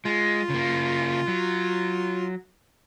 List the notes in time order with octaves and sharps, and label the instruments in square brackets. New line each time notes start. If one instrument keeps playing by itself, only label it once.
[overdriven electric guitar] G#3 [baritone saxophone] F4
[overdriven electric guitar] C#3 A#3
F#3